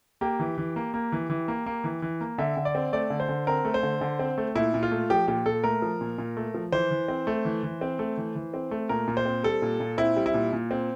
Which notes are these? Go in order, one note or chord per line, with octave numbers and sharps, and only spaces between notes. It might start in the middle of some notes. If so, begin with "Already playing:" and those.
A#3 G4
E3
E3
A#3
A#3
E3
E3
A#3
A#3
E3
E3
A#3
D3 E5
D3
D5
C4
A3 D5
D3
C5
D3
C4 A#4
A3
C5
D3
D3
C4
A3
A#2 E4
A#2
F4
A3
F3 G4
A#2 G4
A#2 A4
A3 A#4
F3
A#2
A#2
A3
F3
E3 C5
E3
C4
A3
E3
E3
C4
A3
E3
E3
C4
A3
A#2 A#4
A#2
C5
C4
G3 A4
A#2
A#2
C4 E4
G3
E4
A#2
A#2
C4